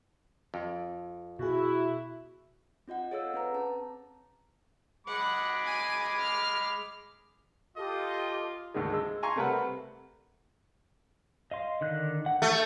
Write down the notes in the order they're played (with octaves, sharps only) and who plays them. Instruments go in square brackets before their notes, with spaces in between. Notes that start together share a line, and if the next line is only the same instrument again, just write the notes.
[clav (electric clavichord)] F2
[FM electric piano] B2 G#4 [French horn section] E4 [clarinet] F#4
[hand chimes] C4 F4 D#5 F#5
G#4 A4 C#5 F5 F#5 E6
C4 B4 A#5
C#4 A5
[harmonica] G#3 B5 D6 [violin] F#5
[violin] G#5 D#7
F6
[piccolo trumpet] F4 [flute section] G4 A4 [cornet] D#5
[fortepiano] D2 G#2 D3 D#3 G#3
G#3 E6
G#5 A#5 C6 C#6
C3 G3 A3 A#4 B4 F#5
[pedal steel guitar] D#5 F5 C6
D3 D#3 F#6
F#5
[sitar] A3 [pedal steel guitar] F#6 G6